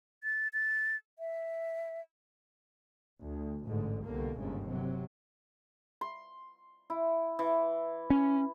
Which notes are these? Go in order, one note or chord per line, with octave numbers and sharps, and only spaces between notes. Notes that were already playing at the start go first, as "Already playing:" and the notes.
A6
A6
E5
D2
A1 G#2 D3
C2 B2 D3 A#3
G1 D#2 G#2 C#3
C3 F#3
C6
E4
E3
C#4